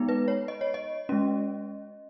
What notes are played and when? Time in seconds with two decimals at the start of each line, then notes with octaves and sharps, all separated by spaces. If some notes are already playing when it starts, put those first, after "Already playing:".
Already playing: G#3 B3 D#4
0.09 B4
0.28 C#5
0.48 D#5
0.61 C#5
0.74 D#5
1.09 G#3 C#4